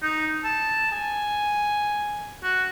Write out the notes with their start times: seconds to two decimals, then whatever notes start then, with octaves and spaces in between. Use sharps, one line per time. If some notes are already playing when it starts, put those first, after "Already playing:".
0.02 D#4
0.44 A5
0.92 G#5
2.43 F#4